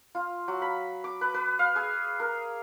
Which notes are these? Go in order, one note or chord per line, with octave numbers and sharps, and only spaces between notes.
F4
F#3
B5
D6
B4
B4
F5
G#4
A#4